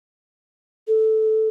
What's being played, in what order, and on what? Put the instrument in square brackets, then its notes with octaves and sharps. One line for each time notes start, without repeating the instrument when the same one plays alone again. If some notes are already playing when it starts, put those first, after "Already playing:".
[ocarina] A4